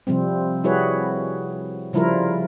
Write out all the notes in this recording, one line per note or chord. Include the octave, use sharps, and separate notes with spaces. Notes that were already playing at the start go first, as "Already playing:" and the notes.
C3 F3 G3 C4
G3 E4 F#4 G#4 B4 C#5
C#3 F3 G3 E4 F4 A#4